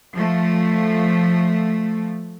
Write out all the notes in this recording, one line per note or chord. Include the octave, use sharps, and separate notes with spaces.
F3 A3